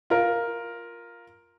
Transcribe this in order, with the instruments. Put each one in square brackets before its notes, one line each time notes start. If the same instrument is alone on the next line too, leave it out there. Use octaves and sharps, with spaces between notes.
[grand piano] F4 A#4